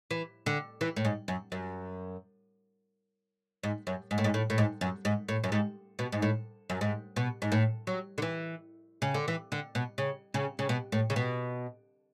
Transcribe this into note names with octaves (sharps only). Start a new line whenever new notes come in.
E3
D3
E3
A2
G#2
F#2
F#2
G#2
F#2
G#2
A2
G#2
A2
A2
G#2
F#2
G#2
A2
F#2
G#2
B2
G#2
A2
F#2
G#2
B2
G#2
A2
F#3
D3
E3
C#3
D3
E3
D3
B2
C#3
C#3
C#3
B2
A2
C#3
B2